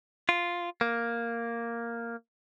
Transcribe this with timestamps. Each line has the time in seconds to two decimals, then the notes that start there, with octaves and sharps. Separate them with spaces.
0.29 F4
0.81 A#3